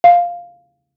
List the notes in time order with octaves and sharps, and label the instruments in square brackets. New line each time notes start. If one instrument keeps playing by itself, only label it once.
[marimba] F5